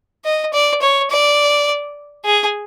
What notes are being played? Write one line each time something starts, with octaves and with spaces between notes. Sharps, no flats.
D#5
D5
C#5
D5
G#4